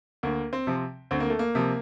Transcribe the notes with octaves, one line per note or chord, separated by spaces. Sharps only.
D2 A#3
C4
C3 F3
D2 C4
A#3
A3
A#3
C3 F3